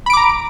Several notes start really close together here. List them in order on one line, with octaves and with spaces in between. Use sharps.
B5 D7 D6 A#5